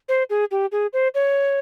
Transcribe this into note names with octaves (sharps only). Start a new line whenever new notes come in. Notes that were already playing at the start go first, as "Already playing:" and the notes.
C5
G#4
G4
G#4
C5
C#5